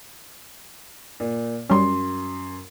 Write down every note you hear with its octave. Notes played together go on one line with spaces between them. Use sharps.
A#2
F#2 G3 C#4 C6